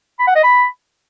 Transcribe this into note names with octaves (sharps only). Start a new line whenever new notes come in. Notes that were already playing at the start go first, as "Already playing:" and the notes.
B5
F#5
D#5
B5